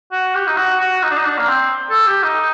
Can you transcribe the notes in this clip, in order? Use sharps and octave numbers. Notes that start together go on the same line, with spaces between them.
F#4
G4
D#4
F#4
F#4
D#4
D4
D#4
D4
A#3
C4
A4
G4
D#4